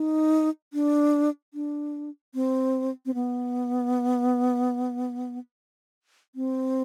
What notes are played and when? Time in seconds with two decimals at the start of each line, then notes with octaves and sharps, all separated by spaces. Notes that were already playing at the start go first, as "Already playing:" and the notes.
Already playing: D#4
0.73 D4
1.54 D4
2.34 C4
3.06 C4
3.14 B3
6.35 C4